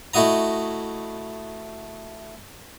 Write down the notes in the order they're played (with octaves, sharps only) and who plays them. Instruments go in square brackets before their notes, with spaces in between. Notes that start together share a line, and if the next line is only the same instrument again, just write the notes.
[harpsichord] A3 E4 F#4 D#5 A#5